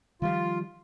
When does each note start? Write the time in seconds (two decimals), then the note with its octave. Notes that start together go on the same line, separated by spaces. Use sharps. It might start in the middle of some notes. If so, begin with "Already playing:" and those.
0.22 D#3 F3 G3 F4